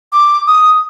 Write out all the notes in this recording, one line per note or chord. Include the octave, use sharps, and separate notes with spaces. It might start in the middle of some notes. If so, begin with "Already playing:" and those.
D6
D#6